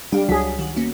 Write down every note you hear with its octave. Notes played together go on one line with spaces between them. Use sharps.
G3 D4 F5
C#2 F#3 G#4 B6
D#3 F#4
A#3 B3 C#4